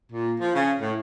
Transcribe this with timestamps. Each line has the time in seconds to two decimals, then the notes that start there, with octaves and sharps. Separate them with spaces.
0.13 A#2
0.40 F3
0.55 C#3
0.81 A2